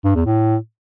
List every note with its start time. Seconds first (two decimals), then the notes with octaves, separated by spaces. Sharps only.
0.05 G2
0.15 E2
0.26 A2